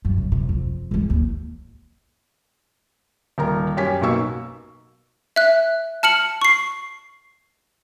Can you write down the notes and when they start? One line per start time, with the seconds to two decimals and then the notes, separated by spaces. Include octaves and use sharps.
0.05 F#2
0.18 C#3
0.32 C3
0.49 F2
0.91 G#1 E3
1.10 D#2
3.38 D#1 A#4 A#5
3.77 F#2 C#4 G4 G#5 B6
4.02 B1 B2 A#3 C#6 E6
5.36 E5 F#6
6.03 A5 F6 C#7 F#7
6.41 C#6 C7